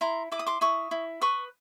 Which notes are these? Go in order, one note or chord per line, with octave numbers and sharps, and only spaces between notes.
E4 A#5 C6
E4 D6
D#6
C6 D6
E4 C#6 D#6
E4
B4 C#6 D#6